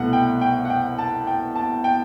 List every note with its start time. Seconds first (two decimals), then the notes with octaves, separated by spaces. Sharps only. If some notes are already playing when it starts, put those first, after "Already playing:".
Already playing: C2 B2 A3 F#5
0.13 G5
0.41 G5
0.65 F#5
0.70 G5
0.99 A5
1.27 G5
1.56 A5
1.84 G5